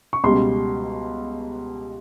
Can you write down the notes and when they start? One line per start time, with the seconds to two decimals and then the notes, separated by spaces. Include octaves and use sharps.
0.13 C#6
0.24 C#2 B2 G3 C6